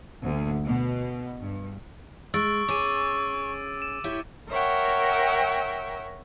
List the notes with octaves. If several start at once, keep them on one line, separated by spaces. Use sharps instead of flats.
D2
B2
G2
G#3 C#6 E6 A6 D7
C#4 G#4 D6 D#7
E7
E4 G4 C#5
A#4 C#5 E5 F#5 G5